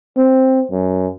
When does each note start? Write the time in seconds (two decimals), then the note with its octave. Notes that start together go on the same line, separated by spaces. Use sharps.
0.17 C4
0.71 F#2